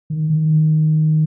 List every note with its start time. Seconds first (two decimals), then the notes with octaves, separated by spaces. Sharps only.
0.10 D#3
0.30 D#3